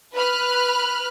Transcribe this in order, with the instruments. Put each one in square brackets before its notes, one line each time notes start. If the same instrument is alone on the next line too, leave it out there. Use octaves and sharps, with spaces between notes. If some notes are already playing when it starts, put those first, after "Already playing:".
[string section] B4 B5 F6 F#6